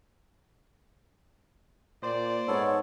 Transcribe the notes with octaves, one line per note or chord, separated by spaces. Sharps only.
A#2 C5 D5
G#2 B3 A4 C#5